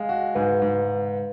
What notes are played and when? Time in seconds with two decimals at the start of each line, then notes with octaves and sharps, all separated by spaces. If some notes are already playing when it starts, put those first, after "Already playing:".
Already playing: G#3 F5
0.09 F#4
0.35 G#2 B4
0.62 G#2